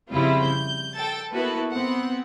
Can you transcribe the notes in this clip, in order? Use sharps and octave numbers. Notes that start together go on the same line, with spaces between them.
F2 C#3 G3 C4 E4 F4
G6
A4 G5 A6
A#3 B3 E4 F#4 A4 B4
B3 C4 F#5